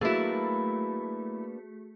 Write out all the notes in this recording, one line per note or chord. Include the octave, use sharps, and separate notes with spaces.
F#3 A3 A#3 D4 E4 F#4 G#4 B4